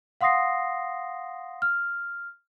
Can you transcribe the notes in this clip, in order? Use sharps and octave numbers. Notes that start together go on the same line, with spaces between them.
F5 F#5 C6 D#6 A#6 C7
F6